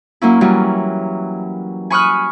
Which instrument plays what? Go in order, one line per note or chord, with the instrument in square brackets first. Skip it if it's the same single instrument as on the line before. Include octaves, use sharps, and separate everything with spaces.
[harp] F#3 A#3 C#4 E4
E3 F#3 G3 C#4
G#5 B5 C#6 D#6 F6 F#6